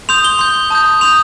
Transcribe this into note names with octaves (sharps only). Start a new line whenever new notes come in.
C6 D#6 G6 F7
G7
C6 G6 G7
A5 D#6 G6
C6 D#6 G6 F7